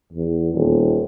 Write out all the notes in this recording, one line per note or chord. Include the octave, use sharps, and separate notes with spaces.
E2
D#1